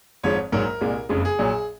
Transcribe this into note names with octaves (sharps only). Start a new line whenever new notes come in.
G#1 G#2 F3 G#3 C#5
A#1 G#2 F#3 A#4
C2 A#2 G#3
F#1 F2 C#3 G#3
G#4
A#1 A#2 F#3